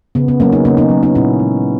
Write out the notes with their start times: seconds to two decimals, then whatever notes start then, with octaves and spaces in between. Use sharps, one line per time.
0.15 C#3 B3
0.28 B3
0.40 F#3 A#3 C#4
0.52 B3 D#4
0.65 C#3 A#3 C#4
0.77 B3 D#4
0.89 F#3 A#3
1.03 B3 D#4
1.15 A#2 C#4 E4
1.39 G#3